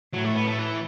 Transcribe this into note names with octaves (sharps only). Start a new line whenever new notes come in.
A2 F#3
A3
B3
A3
E3